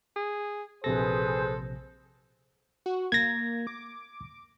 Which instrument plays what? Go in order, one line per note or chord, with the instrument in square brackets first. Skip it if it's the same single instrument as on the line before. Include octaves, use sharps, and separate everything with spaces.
[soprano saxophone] G#4
[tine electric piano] A#1 C3 A#6 [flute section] G#4 B4 [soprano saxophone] A4 [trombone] C5
[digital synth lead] F#4
[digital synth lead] A#3 [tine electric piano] G#6 A#6
[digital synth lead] D6